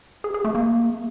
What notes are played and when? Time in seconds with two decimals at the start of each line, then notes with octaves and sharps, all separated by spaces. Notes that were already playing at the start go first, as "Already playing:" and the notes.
0.24 G#4
0.34 G#4
0.45 A3
0.55 A#3